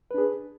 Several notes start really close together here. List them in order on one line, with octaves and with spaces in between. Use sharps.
B4 D4 G#4